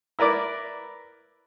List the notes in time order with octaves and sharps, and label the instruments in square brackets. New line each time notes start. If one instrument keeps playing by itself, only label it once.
[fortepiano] E4 A#4 B4 D5 D6